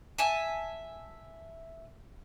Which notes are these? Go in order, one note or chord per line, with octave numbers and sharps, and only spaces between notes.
E5 G#5 A5